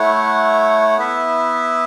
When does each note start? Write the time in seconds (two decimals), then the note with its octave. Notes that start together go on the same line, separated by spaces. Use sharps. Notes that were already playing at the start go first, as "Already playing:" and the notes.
Already playing: A3 E4 C#5 F#5
0.97 B3 E4 B4 E5